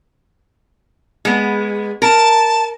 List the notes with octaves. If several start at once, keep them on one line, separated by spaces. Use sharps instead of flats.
G#3 B3
A#4 A5